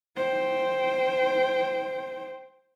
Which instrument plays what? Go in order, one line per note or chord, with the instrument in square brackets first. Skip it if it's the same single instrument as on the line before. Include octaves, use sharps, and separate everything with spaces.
[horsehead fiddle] C5 G5